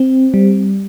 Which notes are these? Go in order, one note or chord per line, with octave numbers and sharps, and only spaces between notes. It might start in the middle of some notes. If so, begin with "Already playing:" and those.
Already playing: C4
G3